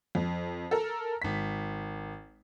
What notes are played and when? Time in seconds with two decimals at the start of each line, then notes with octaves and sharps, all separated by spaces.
0.15 F2
0.71 A4 A#4
1.22 G#1 B6